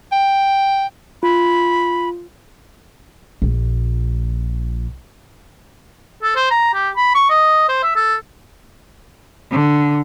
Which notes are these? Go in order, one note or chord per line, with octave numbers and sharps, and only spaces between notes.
G5
F4 B5
A#1 A#2
A4
C5
A#5
G4
B5
C#6
D#5
C5
E5
A4
D3